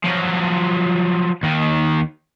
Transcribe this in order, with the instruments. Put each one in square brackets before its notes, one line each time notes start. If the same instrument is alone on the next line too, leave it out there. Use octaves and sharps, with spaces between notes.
[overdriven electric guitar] F3 F#3
D#2 D#3